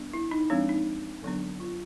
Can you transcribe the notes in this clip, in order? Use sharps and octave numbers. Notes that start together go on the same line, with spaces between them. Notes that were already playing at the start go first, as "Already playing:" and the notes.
Already playing: G3 B3 D4
E4
D#4
F3 G#3 C4 D4
D#4
D3 F#3 B3 D4
F4